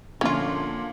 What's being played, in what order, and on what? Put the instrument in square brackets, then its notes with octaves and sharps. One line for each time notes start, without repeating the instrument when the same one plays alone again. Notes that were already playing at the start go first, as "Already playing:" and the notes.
[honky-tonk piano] A#2 F3 [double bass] D3 [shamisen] C#4 F4